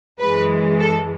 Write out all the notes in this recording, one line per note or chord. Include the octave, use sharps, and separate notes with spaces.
F#2 E3 G#3 B4
A4